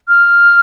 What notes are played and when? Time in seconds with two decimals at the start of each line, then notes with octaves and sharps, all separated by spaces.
0.08 F6